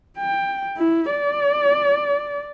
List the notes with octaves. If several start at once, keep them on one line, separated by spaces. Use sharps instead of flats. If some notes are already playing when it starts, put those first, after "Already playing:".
G5
E4
D5